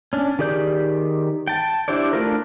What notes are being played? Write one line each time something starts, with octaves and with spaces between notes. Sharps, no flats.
C#4 D4
D#3 G4 G#4 D5 G6
G5 A5
D4 E4 G4 C5 D5
A3 D4 F4 A4 A#4